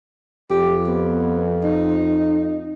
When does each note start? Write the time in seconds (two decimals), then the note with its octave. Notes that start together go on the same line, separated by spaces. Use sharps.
0.50 F2 G4
0.88 B3
1.64 D#4